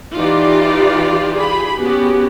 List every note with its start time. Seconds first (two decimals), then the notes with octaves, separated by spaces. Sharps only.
0.16 E3 D#4 F4 G4 D5
1.35 G4 G#4 B5
1.81 B3 C#4 F#4 G4